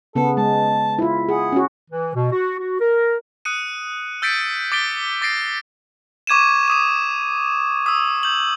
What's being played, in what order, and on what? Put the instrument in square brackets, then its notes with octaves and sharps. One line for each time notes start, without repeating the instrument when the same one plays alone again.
[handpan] C#3 B3 [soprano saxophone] A4
[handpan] G#3 [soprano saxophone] A5
[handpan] E4 F4
[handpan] G#4 [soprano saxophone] F#5
[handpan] C#4 F#4
[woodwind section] E3
B2
F#4
F#4
A#4
[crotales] D#6 F#6 C#7 D#7
E6 G6 A6 B6 C#7 D7
D6 A6 B6 D7 G7
D6 A6 A#6 C7 D7
C#6 D6 G#6 D#7 E7
D6 D#6 D#7
D#6 E6
G6 F#7